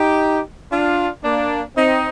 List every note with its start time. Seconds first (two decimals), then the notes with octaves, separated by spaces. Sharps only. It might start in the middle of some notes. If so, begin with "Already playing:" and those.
Already playing: D#4 G4
0.71 D4 F4
1.24 A#3 D4
1.76 C4 D#4